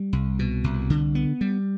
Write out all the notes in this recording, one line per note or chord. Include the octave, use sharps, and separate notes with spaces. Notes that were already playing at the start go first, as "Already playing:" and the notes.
Already playing: G3
C2
B2
C2
D3
B3
G3